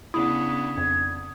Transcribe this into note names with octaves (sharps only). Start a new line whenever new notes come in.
C#3 B3 D4 E4 D#6
F2 G#6